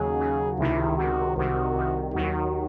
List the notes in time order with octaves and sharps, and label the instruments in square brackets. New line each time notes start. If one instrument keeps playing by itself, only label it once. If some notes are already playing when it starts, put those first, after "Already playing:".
Already playing: [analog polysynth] D#2 C#3 F#3 [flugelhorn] G#4
[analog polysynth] D#2 C#3 F#3
[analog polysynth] C#2 C3 D#3 [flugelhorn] E4
[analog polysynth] C#2 C3 D#3 [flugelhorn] F#4
[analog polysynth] C2 C3 D#3 [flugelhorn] F#4
[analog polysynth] C2 C3 D#3
[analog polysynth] D#2 D#3 F#3 [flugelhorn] F#4